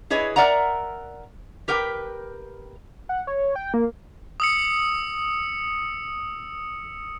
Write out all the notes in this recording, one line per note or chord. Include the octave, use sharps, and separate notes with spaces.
E4 G#4 B4 C#5 D#5
A#4 D5 E5 F#5 A#5
G4 A#4 B4 G5
F#5
C#5
G5
A#3
D#6 E6 C#7